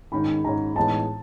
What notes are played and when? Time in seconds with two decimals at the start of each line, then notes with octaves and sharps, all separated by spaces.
0.12 G#2 D#3 G#3 C#4 B5
0.44 G#2 D#3 G#3 C#4 A#5
0.76 A2 E3 G#3 B3 D#4 A5